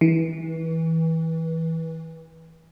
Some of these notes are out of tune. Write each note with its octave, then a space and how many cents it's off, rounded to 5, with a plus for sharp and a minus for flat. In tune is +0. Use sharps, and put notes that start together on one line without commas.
E3 -25